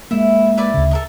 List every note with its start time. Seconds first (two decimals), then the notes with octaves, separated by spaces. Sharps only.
0.11 G#3 A#3 E4
0.58 E4 B4 D5
0.74 D2 C#3
0.91 A4 A#4 D#5